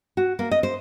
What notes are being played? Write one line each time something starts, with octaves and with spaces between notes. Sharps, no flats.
F#4
A#3
D#5
C5